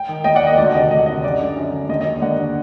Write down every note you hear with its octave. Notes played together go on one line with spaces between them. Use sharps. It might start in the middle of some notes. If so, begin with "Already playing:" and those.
Already playing: G5
D#3
D#2 D#5 G5
D5 F#5
D#3
D#5
D2 D5
C3 D#3 D#5
D2 D#5
F#5
C3 D#3 D#5
F#2 D5
D3
F#2
D3
D#2 D#5
D#5
D3
D#2 D5 F#5
D3